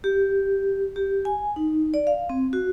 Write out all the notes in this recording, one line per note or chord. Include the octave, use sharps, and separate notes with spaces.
G4
G4
G#5
D#4
D5
F5
C4
F#4